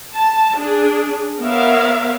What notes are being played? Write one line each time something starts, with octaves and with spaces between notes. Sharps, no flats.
A5
D4 G#4
B3 A#4 C#5 E5 F5